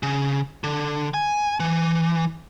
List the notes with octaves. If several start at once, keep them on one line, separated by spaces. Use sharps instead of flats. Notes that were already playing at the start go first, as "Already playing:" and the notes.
C#3
D3
G#5
E3